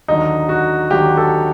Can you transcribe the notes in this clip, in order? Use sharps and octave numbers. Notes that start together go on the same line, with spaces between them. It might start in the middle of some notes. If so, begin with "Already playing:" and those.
D#2 D3 F#3 D#4
F#4
D#2 D3 F#3 G4
A4